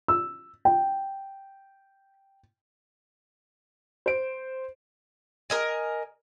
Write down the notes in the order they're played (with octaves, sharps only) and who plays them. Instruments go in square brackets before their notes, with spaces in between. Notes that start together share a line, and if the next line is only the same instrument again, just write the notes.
[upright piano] E6
G5
[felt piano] C5 D7
[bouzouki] A#4 D#5 G#5